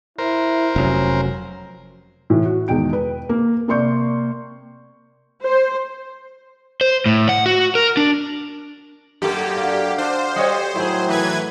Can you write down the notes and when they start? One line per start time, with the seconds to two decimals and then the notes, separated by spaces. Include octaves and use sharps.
0.18 E4 A#4 C5
0.76 F1 F#3 C#4
2.30 A2 E3
2.45 F#4
2.68 E2 B2 D#3 G#3 G5 D7
2.93 B4
3.29 A#3
3.68 C3 A#3 D5 C6 C#6 G6
5.42 C5
6.81 C5
7.06 A2
7.29 F#5
7.46 F#4
7.75 A#4
7.97 D4
9.22 F#2 A#3 F#4 G4 A4
9.57 D3 F5 F#5 C#6
9.98 D4 C5
10.36 G3 C#5 D#5 G5
10.75 A2 D#3 F#3 E4 G#4
11.08 A2 E3 B4 G#6